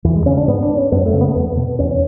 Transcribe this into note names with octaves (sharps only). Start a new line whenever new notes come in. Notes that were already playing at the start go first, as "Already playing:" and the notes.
E2 E3
G#3
C#3 C#4
D4
G#2 B3
D4
C#4
F#2 B3
A3
C#3
B3
A3
E2 B3
B2
E2 C#4
C#4